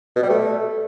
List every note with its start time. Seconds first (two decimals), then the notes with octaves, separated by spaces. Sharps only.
0.16 B2
0.23 G3
0.30 A3